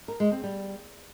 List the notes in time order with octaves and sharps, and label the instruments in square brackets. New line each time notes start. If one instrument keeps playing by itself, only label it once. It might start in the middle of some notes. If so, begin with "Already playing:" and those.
[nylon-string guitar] A#4
G#3
C4
G3